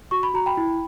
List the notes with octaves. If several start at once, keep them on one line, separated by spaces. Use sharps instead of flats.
F#4 C#6
B5
F#4 A#5
G5 B5
E4